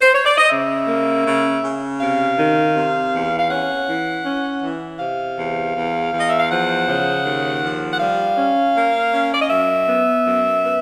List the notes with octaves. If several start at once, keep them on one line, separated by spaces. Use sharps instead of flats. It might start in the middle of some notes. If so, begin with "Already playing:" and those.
C5
C#5
D5
D#5
C#3 E5
A#3
C#3
C#3
C3 F5
D#3
C3
E2
F5
C#4 F#5
E3
C#4
E3
C3 F5
E2
E2
E2
D#5
E5
F5
F3 F#5
C#3
D#2
F3
F#5
G3 F5
C#4
A#3
C#4
D5
D#5
F#2 E5
B3
F#2
B3